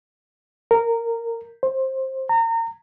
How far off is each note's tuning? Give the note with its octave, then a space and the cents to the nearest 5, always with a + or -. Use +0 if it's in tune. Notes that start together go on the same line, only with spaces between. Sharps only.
A#4 -15
C5 +15
A#5 -30